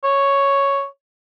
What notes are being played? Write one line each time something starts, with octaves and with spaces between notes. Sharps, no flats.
C#5